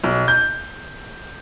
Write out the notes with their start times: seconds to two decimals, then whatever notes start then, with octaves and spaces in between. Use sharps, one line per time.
0.04 B1
0.28 G6